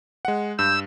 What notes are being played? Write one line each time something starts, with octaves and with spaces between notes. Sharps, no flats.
G#3 F#5
G2 E6 G6